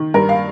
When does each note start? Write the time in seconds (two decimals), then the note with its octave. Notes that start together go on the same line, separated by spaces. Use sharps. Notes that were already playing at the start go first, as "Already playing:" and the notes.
Already playing: D#3
0.14 G2 A#4
0.29 F5